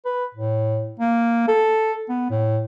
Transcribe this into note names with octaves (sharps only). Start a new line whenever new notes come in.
B4
A2
A#3
A4
B3
A2